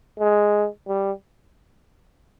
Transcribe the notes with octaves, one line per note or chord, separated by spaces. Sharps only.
G#3
G3